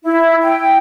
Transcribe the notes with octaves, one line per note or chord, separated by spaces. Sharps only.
E4
G5